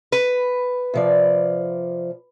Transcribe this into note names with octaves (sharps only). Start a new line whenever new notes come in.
B4
C3 F3 D5